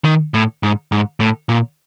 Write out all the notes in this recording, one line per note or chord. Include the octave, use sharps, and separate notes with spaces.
D#3
A2
G#2
G#2
A2
A#2